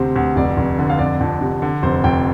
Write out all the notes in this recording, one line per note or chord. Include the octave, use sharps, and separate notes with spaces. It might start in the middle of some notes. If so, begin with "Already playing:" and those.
Already playing: D2 C3 C5
D2
F1 D5
F1
D3
F5
F1 D5
F2
C3
D3
F1 C5
F1 G5